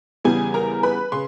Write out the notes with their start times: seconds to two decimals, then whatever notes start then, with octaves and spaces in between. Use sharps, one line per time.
0.24 E2 C#3 E3 G3 B3 G#4 G#5
0.54 A#4 A#5
0.83 B4 B5
1.12 C#3 C6